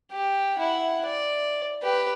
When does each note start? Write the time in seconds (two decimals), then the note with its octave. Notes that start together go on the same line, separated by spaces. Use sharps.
0.11 G4
0.56 E4 F#5
1.06 D5
1.82 G4 B4